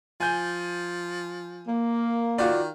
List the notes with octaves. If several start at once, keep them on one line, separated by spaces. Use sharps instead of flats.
F3 G#5 G6
A#3
D#3 F4 F#4 D5